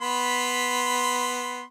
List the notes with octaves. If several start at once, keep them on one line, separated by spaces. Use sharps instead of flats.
B3 B5 C6